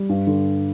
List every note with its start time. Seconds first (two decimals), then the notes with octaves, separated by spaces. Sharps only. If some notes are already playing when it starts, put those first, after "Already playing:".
Already playing: G3
0.09 G2
0.27 D3